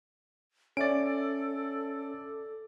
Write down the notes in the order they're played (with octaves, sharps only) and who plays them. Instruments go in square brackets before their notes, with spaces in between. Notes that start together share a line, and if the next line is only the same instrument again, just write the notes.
[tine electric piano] C#4 E5 A6 [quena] A4 [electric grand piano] D5 D7